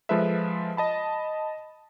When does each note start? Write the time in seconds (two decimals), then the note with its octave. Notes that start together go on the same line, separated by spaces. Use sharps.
0.09 F3 G#3 F4 A4 B4 E5
0.77 D#5 A5 B5